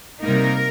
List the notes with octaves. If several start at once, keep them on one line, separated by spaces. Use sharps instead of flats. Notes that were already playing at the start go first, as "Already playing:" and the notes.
C3 G3 A#3 D#4 A#4